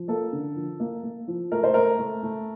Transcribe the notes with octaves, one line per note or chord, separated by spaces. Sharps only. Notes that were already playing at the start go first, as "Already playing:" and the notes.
Already playing: F3
A#3 A4
D3
F3
A#3
A#3
F3
A3 A#4
C5
A3 A#4
A3
A3